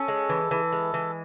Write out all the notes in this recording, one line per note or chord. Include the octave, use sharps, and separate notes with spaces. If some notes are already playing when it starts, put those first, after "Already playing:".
Already playing: C#4 A4
G#3
E3
E3
G#3
E3